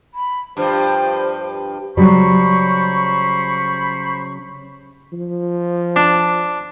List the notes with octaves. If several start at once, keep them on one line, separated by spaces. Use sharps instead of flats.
B5
G2 F3 C5
C#3 F#3 G3 C5 B5 C#6
F3
D4